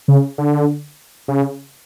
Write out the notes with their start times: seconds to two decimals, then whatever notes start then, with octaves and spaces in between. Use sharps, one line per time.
0.08 C#3
0.38 D3
1.28 C#3